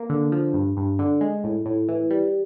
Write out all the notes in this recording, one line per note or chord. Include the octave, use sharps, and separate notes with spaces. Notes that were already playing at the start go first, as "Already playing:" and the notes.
Already playing: A#3
D3
F3
G2
G2
D3
G#3
A2
A2
E3
G3